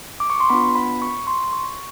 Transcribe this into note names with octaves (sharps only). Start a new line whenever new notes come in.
D6
C#6
C6
B3 D4 F4 B5
B5
C#6
C6
C#6